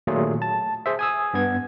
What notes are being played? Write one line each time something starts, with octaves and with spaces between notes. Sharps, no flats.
A#2 D#3 F#3 A3 F4 G#4
A5
G#4 C5 E5
G#5 D#6 E6
G2 B3 G#6